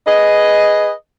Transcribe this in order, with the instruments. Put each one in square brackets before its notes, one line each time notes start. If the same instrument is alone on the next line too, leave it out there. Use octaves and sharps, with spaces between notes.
[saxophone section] G#4 B4 D#5